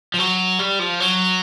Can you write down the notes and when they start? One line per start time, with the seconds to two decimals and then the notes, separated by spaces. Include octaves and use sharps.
0.14 F3
0.19 F#3
0.59 G3
0.79 F3
1.00 F#3